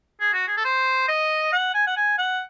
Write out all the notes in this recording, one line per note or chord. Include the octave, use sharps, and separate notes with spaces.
G#4
F#4
G#4
A4
C5
D#5
F#5
G#5
F#5
G#5
F#5